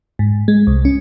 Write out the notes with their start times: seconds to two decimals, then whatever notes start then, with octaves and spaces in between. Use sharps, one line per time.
0.19 G#2
0.48 G#3
0.67 C2
0.85 C#4